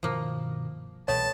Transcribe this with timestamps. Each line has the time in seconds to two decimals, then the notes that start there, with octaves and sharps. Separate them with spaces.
0.03 G2 B2 D#3 F3 A#3
1.08 C2 B2 E3 A3 B3 C#5 A5